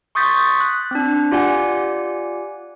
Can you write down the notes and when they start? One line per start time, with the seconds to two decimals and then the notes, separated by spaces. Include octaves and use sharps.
0.15 C6 C#6 D#6 G6 A6 B6
0.61 F#6
0.91 C4 D4
1.31 F4 G4 D5 F#5 G#5